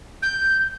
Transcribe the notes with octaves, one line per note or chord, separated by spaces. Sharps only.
G6